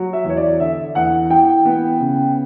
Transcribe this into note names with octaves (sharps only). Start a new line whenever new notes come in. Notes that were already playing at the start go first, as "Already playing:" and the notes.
Already playing: F#3
E5
E2 C#5
D5
D3 E5
E2 F#5
E3 G5
B3
C#3